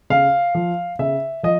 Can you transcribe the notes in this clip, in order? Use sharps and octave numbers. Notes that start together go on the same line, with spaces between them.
C#3 F5
F3
C#3 E5
F3 D#5